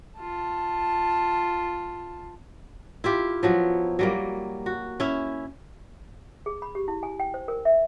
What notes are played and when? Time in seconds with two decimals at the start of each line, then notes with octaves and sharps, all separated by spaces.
0.18 F4 A5
3.04 E4 F4 G4
3.43 F3 F#3 B3 E4
3.99 F#3 G3 A#3
4.66 F#4
5.00 C#4 E4
6.46 G#4
6.62 B5
6.75 G4
6.88 E4
7.03 G#5
7.20 G5
7.34 C5
7.48 A#4
7.65 E5